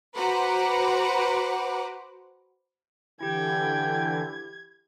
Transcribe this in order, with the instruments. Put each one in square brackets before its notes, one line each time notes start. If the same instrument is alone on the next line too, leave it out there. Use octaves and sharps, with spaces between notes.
[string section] F#4 B4 C5 F#5 A#5 D6
[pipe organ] D3 E3 [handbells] E4 G4 [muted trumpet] G5 [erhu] G#6